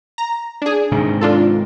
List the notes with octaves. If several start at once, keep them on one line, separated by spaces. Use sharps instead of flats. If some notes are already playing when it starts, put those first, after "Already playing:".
A#5
D4 G#4
G#2 C3 D#3
D4 F4 A4